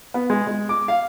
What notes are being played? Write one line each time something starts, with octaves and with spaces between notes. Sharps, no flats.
B3
G#3
G#3
D6
F5